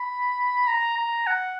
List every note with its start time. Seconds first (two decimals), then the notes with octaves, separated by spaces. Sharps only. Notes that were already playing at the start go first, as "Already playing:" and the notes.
Already playing: B5
0.67 A#5
0.97 A#5
1.27 F#5